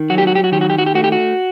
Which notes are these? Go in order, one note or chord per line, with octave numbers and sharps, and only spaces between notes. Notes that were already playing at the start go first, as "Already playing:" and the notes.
Already playing: D#3
F#3 F#4
G4
F#4
G4
F#4
D#3 G4
F#4
G4
F#4
G4
A3 F#4
G4
F#4